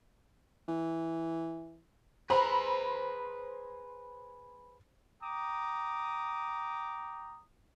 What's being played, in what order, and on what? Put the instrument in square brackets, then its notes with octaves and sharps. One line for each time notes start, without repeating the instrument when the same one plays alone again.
[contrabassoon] E3
[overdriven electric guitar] G#4 B4 [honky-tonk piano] C5 A#5 B5
[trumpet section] G5 A#5 D6 D#6